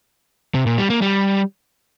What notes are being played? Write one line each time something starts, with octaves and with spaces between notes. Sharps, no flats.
C3
A#2
G3
A#3
G3